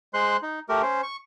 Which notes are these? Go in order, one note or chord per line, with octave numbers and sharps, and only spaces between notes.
G#3 C5 C6 F#6
D#4
A3 G4 A#4
C#4 C5
C#6